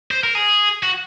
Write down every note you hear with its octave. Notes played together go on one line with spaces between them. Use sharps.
C5
A#4
G#4
F#4